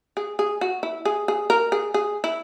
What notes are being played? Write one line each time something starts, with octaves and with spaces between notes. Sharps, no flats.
G#4
G#4
F#4
E4
G#4
G#4
A#4
G#4
G#4
E4